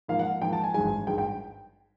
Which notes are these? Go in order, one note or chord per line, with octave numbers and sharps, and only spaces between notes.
G#2 F3 A#3 D#4 F5
F#5
G#2 F3 A#3 D#4 G5
A5
G#5
G#1 G2 D#3 G#3 G#5
G#1 G2 D#3 G#3 G5
G5